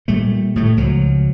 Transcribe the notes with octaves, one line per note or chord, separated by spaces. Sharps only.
A#2 G3 A3
A2 A3
C#2 F3 F#3